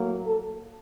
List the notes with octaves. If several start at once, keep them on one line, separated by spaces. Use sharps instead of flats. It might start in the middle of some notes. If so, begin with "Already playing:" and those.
Already playing: A2 F#3 A#3
A4